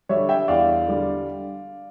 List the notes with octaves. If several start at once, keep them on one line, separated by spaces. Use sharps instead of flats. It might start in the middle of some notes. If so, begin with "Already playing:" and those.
D3 G3 C#5 E5
E5 G5
E2 D5 F5
D3 G3